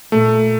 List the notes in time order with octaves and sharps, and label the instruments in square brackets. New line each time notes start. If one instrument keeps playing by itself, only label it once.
[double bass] A#2 [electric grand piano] A3